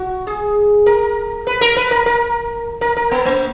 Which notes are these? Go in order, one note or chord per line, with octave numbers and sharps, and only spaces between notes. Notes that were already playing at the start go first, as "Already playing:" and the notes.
Already playing: F#4
G#4
A#4
B4
A#4
B4
A#4
A#4
A#4
A#4
B3
A#3